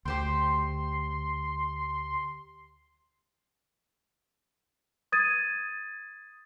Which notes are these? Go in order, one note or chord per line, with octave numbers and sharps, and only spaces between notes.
D2 G4 C5 G5 C6
D#6 G#6 A6 D#7